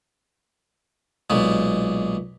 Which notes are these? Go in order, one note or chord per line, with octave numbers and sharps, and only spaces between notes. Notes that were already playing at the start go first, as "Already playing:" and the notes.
B1 A#2 G#3